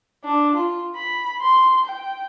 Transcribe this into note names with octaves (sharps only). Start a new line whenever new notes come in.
D4
F4
B5
C6
G5